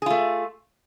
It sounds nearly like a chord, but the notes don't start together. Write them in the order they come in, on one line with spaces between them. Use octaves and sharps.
G#4 F4 A3